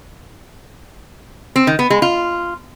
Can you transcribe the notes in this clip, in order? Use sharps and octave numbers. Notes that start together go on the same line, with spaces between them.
C4
D#3
B3
G#3
F4